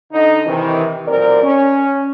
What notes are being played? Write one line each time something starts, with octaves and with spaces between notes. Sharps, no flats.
D3 D#4 D#5
C3 D#3 E3
B1 A#2 C4 A#4 D5
C#4